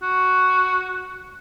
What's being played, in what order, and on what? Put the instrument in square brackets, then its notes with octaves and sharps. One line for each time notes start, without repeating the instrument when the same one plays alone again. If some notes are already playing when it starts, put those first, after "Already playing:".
[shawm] F#4